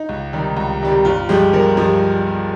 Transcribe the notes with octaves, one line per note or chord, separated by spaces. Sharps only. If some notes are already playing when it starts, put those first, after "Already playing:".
Already playing: D#4
C#2
C3 D#3 G3
C#2
C3 D#3 G3
G1 F4
G2 F3 G#3 G4
G1 A#4
G2 F3 G#3